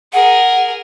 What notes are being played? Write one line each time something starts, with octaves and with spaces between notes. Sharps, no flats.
G#4 A#4 F#5